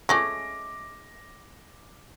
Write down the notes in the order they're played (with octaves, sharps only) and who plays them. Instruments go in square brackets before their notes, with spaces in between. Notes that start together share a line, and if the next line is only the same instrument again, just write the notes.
[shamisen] G#3 A3 C#4 [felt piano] D6 A#6